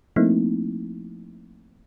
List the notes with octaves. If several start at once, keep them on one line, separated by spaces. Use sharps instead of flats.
F3 A3 A#3 C4 D#4 E4